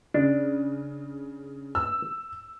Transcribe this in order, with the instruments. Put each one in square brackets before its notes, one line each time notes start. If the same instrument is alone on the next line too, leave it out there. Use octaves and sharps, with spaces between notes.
[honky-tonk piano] C#3 [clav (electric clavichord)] D4
[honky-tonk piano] E6